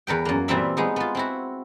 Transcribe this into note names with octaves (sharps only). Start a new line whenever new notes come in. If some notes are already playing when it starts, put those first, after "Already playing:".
E2 A#4 B4 G5
F#2 A#3
A#2 E3 G3 C4 E5 B5
G#3 B3 D#4
B3 F4
C4 E4 F#4